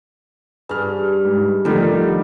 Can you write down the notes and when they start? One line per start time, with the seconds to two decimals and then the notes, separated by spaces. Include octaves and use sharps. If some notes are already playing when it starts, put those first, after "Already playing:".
0.69 G2 G#4 F6
1.25 G#2
1.65 D3 D#3 F3 G3 A3